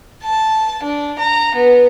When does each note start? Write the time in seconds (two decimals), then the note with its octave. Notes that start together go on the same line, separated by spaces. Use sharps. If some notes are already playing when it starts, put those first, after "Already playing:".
0.24 A5
0.83 D4
1.19 A#5
1.55 B3